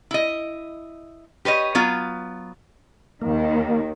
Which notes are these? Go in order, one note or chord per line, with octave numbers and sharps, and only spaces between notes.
E4 D#5
G4 B4 C#5 D#5
F#3 B3 F4
D#2 D#3 A#3